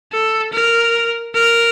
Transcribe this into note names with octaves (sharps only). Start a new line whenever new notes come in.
A4
A#4
A#4